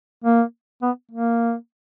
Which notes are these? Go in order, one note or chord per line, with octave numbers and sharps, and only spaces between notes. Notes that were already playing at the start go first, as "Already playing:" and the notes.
A#3
B3
A#3